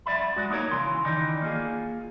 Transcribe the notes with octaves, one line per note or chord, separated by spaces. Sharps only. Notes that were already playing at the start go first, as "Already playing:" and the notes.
F#2 D5 E5 B5
G#3 F#4
A#3 D#4 E4 A#4 C#5 A#5
C#3 E3 C6
D#3 E3 D#4 D5
A#3 F4 G#4